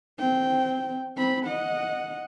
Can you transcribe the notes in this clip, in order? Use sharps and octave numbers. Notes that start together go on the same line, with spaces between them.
C4 G5
C4 B5
D#5 F#5